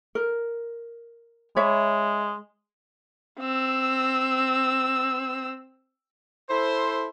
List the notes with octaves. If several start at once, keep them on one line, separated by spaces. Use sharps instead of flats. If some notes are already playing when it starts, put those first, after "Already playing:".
A#4
G#3 C#5 E5 B5
C4 E6
E4 A4 C5